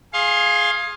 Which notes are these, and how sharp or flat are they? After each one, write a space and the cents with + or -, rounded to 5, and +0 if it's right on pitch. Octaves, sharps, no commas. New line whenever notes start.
G#4 +0 F5 +0 C6 +30